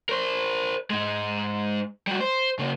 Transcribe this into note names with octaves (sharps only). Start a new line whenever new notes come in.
A#4 C5
G#2 G#3
G3 F#4
C5
C#3 A#3